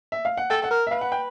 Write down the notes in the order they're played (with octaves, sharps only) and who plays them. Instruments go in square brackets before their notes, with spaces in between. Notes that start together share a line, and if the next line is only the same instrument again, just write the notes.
[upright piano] E5
F5
F#5
[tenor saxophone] A4 [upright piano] G5
[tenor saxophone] A4 [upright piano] F#5
[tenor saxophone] A#4
[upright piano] E5
[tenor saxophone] B4 [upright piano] F5
[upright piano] F#5
G5